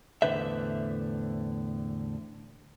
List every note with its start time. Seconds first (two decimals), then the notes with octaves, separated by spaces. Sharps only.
0.22 E2 A2 D3 B4 C5 E5